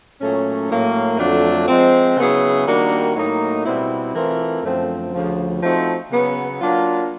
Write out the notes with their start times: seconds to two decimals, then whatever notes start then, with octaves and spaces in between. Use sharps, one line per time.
0.21 A#2 F#3 A3 C#4
0.70 A2 F#3 A#3
1.19 F2 D3 F#3 A3 D4
1.68 F3 G#3 C4
2.17 C#3 F#3 B3 E4 G#4
2.66 D#3 G3 A#3 D4 F#4
3.16 A2 F#3 A#3 D#4
3.65 B2 G3 C4 E4
4.14 E3 A3 C4 F4 A#4
4.63 F#2 D3 F3 A3 C4
5.13 D2 C#3 F3
5.62 F3 A3 C4 D#4 F#4
6.11 C#3 F#3 B3
6.61 F#3 A#3 D4 F4